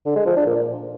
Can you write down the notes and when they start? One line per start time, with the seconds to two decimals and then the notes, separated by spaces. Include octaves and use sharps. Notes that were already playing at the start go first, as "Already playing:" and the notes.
0.05 D3
0.16 G#3
0.26 F3
0.36 D4
0.46 A#2